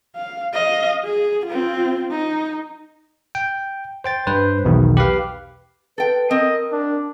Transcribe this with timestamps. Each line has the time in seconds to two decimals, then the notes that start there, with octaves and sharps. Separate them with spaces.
0.16 F5
0.53 D#5 F5
1.05 G#4
1.46 C4 F4
2.11 D#4
3.35 G5
4.04 C5 G5 A6
4.27 G2 B4 C5
4.65 B1 E2 B2 D#3
4.97 G4 B4 F5
5.98 A4 B4 G5
6.31 C4 A#4 D#5
6.72 D4